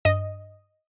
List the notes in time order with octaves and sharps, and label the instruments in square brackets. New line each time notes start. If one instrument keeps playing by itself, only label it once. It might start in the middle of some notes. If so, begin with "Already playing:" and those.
[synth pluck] G2 [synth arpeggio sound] D#5